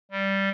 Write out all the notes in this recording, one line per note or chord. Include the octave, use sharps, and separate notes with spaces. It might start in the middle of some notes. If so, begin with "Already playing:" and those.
G3